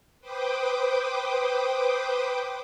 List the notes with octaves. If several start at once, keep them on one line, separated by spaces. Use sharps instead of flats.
B4 C5 G5 D6 D#6